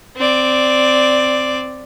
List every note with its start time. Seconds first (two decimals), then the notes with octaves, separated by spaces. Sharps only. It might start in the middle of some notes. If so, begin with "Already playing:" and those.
0.17 C4 D5